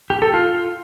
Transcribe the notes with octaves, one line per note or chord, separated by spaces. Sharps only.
G4
A4
F4